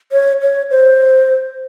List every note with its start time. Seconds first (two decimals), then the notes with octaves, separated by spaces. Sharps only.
0.12 C#5
0.41 C#5
0.71 C5